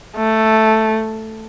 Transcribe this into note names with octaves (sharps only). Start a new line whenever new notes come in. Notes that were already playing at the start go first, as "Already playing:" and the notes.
A3